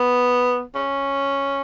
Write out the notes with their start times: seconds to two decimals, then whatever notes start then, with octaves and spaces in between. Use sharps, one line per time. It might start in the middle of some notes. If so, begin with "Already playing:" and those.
Already playing: B3
0.75 C#4